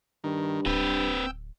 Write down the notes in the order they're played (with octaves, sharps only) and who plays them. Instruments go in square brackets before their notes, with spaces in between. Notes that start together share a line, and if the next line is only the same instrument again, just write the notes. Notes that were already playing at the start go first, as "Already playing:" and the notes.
[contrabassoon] G2 [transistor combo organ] D#3
[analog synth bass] D1 [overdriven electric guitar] C4 B4 [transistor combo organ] G5 E6